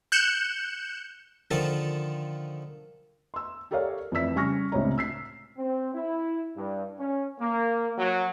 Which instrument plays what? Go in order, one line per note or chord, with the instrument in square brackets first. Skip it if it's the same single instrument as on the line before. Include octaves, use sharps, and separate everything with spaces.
[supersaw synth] F#6 G6 C#7 E7
[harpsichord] D3 D#3 F3 F4 A4 A5
[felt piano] C6 E6
G4 A4 A#4 C#5 D5 F5
F2 E3 A3 D5 E6 B6
C#3 G3 G#5 C#6 F6 A#6
C#2 A2 C3 D4 C#5 A#5
E6 B6 C7
[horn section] C4
E4
G2
C#4
A#3
F#3